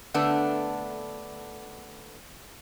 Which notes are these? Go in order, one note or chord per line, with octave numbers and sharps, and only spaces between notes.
D3 A3 B3 D4